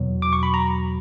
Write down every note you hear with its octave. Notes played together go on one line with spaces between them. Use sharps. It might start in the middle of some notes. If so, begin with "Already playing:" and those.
Already playing: E2 B2 F#3
D6
C#6
B5
A#5